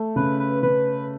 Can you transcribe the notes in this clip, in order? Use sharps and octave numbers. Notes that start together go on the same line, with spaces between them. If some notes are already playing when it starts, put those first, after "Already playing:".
Already playing: A3
C#3 B4
B4
C#3 B4